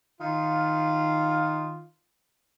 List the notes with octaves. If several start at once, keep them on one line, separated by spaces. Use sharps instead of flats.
D#3 F4